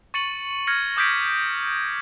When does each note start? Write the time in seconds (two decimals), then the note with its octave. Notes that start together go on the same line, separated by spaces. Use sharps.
0.14 C#6 A6 C#7 D#7 F#7
0.67 F6 G#6 A#6 C#7
0.97 D6 D#6 G6 G#6 B6 D7